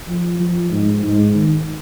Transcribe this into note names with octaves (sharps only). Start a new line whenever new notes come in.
F3
F3
G#2
G#2
D#3